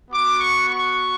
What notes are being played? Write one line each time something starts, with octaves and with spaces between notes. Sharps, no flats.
B3 F#4 D6
C#6
C#6